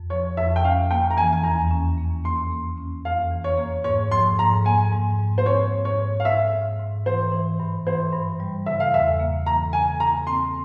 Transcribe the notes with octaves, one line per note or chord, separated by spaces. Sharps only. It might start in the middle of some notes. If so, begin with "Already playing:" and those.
Already playing: F2
F3 C#5
F2 E5
G5
C#4 F5
A#3 G5
A#5
E3 G#5
G#5
E2 A#5
C#4
A#3
A#3 C6
A#3
C#4
F2 F5
E3
C#5
A#3
G#2 C#5
F3 C6
G#2 A#5
A#3 G#5
G#2
G#2
C5
C4 C#5
G#2
C#5
G#2
F5
G#2 E5
G#2
G#2
E3 C5
E3
G2
E3 C5
G2
G3
C#3 E5
F5
E2 E5
A#3
E3 A#5
C#3 G#5
A#3 A#5
C4 C6